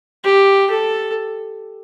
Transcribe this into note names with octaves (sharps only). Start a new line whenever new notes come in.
G4
A4